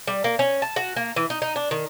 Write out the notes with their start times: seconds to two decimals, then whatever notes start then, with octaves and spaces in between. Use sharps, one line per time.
0.07 G3
0.24 A#3
0.39 C#4
0.62 A5
0.76 F#4
0.96 A#3
1.16 E3
1.30 D#4
1.42 D#4
1.56 D4
1.71 D#3